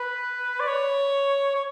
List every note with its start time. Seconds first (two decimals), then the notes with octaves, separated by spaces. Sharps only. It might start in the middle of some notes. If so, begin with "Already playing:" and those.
Already playing: B4
0.60 D5
0.68 C#5
1.54 C#5